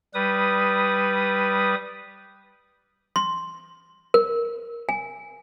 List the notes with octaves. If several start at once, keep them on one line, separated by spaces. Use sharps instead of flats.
G3 B4 D#6
C6
A#4
G#5